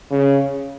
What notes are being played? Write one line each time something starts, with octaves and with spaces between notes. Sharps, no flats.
C#3